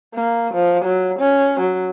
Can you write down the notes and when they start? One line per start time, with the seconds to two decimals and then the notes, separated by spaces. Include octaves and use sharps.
0.14 A#3
0.54 F3
0.85 F#3
1.19 C#4
1.60 F#3